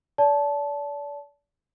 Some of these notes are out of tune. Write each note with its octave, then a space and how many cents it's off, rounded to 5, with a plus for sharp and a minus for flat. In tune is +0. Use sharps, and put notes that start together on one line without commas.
D5 -35 A5 -15